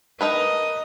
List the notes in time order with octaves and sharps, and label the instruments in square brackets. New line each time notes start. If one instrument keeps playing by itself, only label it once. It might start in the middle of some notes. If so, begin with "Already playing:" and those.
[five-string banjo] D#4 A#4 B4 [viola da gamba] D#5